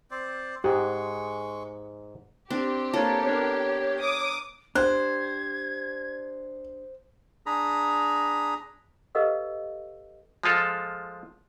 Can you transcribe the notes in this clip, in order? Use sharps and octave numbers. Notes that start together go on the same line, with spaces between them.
C4 C5 D5
G#2 G#3 G4 G#4 F#5 C#6
C4 D4 G4
A#3 D4 F4 A4 C#5
B3 D4 A#4 C#5
D6 D#6
D4 G4 C5 F#6 G#6
D4 G#4 A#5 B5
G4 A4 B4 D#5 F5 E6
F3 G#3 F4 A4